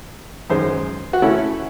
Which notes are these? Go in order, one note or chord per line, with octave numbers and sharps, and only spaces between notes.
F#2 D#3 G#3 C5
F#4
C#3 E3 A3 C#4 E4